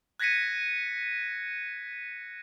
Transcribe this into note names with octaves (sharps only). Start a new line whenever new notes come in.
F#6 G#6 A#6 B6 C#7 D#7